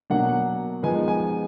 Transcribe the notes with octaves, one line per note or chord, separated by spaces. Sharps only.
B2 F#3 A#3 D4 F#5
F3 G#3 B3 D#4 G#5
G#5